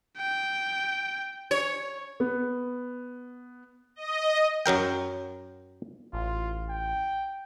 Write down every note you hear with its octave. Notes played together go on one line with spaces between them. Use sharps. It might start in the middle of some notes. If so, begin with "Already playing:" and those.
G5
C#5
B3
D#5
F#2 F#3 A#4 G5
A1 F4
G5